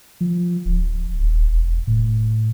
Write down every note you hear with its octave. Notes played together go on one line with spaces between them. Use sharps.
F3
D1
D#1
E1
A2